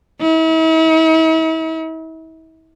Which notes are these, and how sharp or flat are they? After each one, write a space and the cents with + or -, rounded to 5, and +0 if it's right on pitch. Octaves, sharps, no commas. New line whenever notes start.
E4 -45